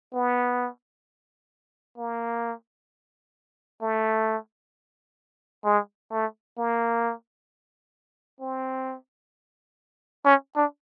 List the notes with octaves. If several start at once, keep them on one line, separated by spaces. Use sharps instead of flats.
B3
A#3
A3
G#3
A3
A#3
C4
C#4
D4